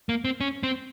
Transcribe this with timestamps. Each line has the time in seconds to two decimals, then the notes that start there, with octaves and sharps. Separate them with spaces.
0.09 A#3
0.25 C4
0.41 C#4
0.63 C4